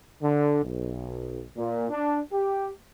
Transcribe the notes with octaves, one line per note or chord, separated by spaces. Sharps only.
D3
B1
A#2
D4
G4